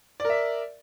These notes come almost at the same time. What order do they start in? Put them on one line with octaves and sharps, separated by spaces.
D5 A#4 E5